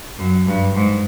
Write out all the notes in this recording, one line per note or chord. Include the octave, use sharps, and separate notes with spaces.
F#2
G2
G#2